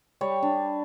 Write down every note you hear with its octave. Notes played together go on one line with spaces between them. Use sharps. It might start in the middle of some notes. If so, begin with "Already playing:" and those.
G3 C#5
D4